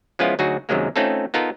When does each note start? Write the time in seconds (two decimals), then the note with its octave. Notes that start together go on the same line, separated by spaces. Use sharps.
0.19 F3 G#3 B3 C#4 E4 F4
0.39 D2 F#3 D#4 F#4 G#4
0.69 F#2 C3 D#3 F#3 G#3 A#3
0.96 A3 C4 C#4 D#4 F4 A4
1.34 B3 D#4 F4 A4 A#4